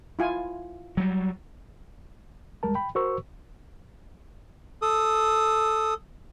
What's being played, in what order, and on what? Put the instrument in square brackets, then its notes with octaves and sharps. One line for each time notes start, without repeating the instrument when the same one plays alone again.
[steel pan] E4 F4 G#5
[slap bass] F#3 G3
[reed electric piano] D#2 G3 G#3 A#4 A5
G5 B5
F#4 A#4 C5 C#6 E6
[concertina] A4 D#6